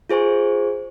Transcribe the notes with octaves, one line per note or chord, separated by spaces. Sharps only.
F4 G#4 C5 G#5 C#6